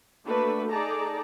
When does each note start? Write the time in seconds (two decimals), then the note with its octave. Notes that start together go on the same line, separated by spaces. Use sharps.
0.24 A3 A#3 D4 F#4 B4
0.70 D#4 G#4 A4 D5 A5 A#5